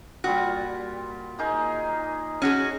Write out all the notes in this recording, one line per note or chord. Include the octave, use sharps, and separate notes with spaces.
A#2 G3 F4 F#4
A#3 D#4 G#4
C#4 F#4 G#4